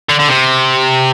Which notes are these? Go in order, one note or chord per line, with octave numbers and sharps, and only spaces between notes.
D3
D3
C3